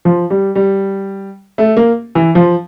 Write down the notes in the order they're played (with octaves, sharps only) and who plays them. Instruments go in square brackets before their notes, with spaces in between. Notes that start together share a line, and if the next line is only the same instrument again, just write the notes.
[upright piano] F3
G3
G3
A3
A#3
E3
F3